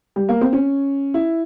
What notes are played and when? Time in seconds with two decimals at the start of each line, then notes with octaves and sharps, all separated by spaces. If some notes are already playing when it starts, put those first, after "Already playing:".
0.16 G3
0.29 A#3
0.41 C4
0.53 C#4
1.14 E4